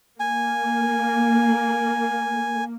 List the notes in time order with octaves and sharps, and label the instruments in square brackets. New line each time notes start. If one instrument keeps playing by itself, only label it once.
[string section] A#3 [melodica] G#5